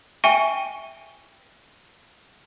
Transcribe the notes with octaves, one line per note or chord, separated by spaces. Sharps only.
E5 G5 G#5 C#6 D#7 G7